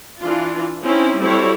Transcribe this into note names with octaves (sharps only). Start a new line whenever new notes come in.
E3 D4 F4
C4 C#4 D#4 E4
G3 C4 E4 F#4 A4 C#5